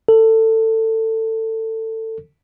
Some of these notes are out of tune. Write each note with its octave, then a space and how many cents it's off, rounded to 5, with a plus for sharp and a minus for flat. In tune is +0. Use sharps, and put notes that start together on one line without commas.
A4 +20